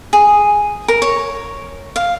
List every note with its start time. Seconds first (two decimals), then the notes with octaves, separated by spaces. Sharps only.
0.13 G#4
0.88 A#4
1.02 C#5
1.96 F5